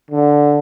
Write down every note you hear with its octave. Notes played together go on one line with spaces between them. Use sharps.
D3